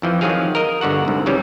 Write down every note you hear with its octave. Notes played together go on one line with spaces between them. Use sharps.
F2 E3 F3
D#3 F3 F#3 C4 G#4 F5
A#4 D#5
G1 D3 F#4 F#5
C2 G#2
C#3 E3 G3 C#4